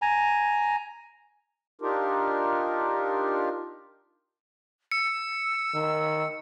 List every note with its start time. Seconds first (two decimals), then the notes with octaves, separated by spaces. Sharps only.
0.02 G#5 A#5
1.82 D4 D#4 F4 G4 A#4
4.92 E6 C#7
5.74 D#3